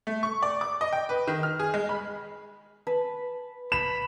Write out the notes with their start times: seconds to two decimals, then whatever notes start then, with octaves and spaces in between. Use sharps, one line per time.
0.07 A3
0.23 C#6
0.43 D5
0.61 D6
0.81 D#5
0.93 G5
1.09 B4
1.28 D#3
1.43 F6
1.60 G#4
1.74 G#3
1.89 B5
2.87 B4 A5 B5
3.72 B5 E7